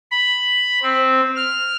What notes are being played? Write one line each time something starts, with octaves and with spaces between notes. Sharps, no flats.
B5
C4
F6